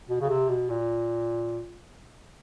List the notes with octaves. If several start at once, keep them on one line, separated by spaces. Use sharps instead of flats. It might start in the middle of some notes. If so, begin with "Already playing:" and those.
B2
C#3
C3
B2
A#2